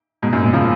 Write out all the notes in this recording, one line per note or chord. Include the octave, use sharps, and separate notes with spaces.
G#2 B2
F#2 A#2
G#2
C#3 F3